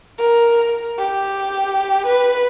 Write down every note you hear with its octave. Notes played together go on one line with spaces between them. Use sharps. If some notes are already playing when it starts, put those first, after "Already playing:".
A#4
G4
B4